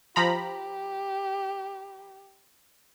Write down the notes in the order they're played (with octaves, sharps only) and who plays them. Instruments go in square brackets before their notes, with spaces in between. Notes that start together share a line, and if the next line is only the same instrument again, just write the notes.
[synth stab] F3 A#5 B5 [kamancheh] G4